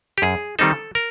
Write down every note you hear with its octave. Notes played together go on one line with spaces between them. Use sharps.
G4
F#2 G#4
D#3 G3 C4 D#4 A4
A#4